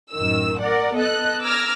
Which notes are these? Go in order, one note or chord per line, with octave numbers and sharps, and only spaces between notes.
A1 F#2 D#3 E6
A#4 D5 F#5
B3 A4 D#5 F#6
A#5 D6 E6 F6 G#6 A#6